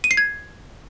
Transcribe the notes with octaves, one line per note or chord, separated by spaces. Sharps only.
D#7
C7
G#6